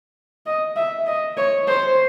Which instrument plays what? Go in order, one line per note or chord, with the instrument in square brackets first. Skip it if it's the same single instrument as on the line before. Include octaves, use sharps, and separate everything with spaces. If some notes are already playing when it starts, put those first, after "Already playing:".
[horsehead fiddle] D#5
E5
D#5
C#5
C5